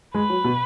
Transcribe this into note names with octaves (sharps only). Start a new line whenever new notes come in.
G#3 B4
F#3
B2